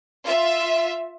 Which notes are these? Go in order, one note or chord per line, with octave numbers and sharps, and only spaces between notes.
F4 E5